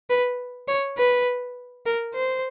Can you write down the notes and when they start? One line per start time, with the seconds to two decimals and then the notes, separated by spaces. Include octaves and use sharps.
0.10 B4
0.68 C#5
0.98 B4
1.86 A#4
2.14 C5